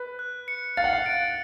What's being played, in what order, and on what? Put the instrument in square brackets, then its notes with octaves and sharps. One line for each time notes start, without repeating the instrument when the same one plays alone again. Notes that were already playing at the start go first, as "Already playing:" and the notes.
Already playing: [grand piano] B4
[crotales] F#6
C#7
[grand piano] F5 [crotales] A6
[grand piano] F#5
F5
[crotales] D7